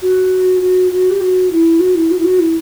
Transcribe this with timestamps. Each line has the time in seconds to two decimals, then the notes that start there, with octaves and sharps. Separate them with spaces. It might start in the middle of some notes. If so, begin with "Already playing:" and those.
0.02 F#4
0.61 F#4
0.91 F#4
1.10 G4
1.20 F#4
1.51 E4
1.80 F#4
1.95 E4
2.11 F#4
2.18 E4
2.25 F#4
2.39 E4